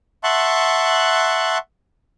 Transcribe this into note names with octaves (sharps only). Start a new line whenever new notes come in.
E5 F#5 A5 C6 C#6 F#6